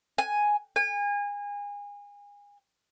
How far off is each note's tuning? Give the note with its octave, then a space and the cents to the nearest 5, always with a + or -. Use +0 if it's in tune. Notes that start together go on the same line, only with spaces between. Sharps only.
G#5 +0
G#5 -30